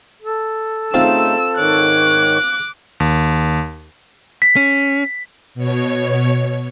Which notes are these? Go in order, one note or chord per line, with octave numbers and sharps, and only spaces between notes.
A4
C#3 A3 C4 D#4 F4 A5 E6
G#2 D#3 C#5 D6 F#6
D#2
B6
C#4
B2 C#5